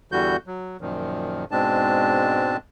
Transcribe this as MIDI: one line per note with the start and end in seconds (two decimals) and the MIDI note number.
0.12 0.37 40
0.12 0.37 50
0.12 0.37 52
0.12 0.37 55
0.12 0.37 66
0.12 0.37 91
0.47 0.77 54
0.81 1.45 42
0.81 1.45 46
0.81 1.45 51
0.81 1.45 53
1.51 2.57 44
1.51 2.57 47
1.51 2.57 56
1.51 2.57 60
1.51 2.57 62
1.51 2.57 81